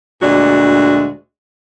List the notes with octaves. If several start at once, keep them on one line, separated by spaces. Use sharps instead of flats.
D2 A#2 G#3 D4 F#4